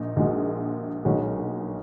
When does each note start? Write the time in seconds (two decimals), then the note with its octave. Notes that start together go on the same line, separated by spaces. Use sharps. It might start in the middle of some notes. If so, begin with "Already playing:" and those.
Already playing: A#1 A#2 D#4
0.16 A#1 A#2 G#3 D#4 F#4
1.05 B1 A#2 G#3 C#4 F#4